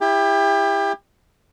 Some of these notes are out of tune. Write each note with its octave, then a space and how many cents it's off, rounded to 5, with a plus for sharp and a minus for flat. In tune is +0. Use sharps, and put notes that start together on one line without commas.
E4 +0 G4 +30